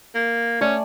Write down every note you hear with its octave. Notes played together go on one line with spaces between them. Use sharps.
A#3
A3 C#4 D5 G#5